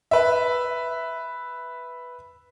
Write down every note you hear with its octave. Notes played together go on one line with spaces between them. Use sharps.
B4 E5